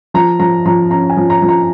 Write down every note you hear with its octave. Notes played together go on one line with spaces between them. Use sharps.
F3 A#5
F3 A#5
F3 A#5
C#4 A#5
G#5
F3
A#5
F3
A#5